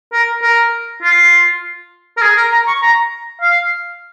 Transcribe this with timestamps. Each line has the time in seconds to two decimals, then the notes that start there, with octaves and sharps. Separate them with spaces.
0.13 A#4
0.42 A#4
1.02 F4
2.17 A#4
2.22 G#4
2.37 A#4
2.52 A#5
2.67 C#6
2.82 A#5
3.41 F5